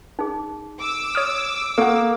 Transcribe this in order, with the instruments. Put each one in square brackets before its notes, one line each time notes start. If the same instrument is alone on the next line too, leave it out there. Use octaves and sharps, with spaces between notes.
[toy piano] D#4 G#4
[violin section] D6 E6
[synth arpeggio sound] C#5 D#6 F6
[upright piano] A#3 [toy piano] A4 [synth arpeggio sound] F#5 C#6